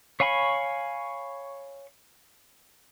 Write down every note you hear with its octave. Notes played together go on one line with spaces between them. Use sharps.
C#5 F5 G#5 B5 C#6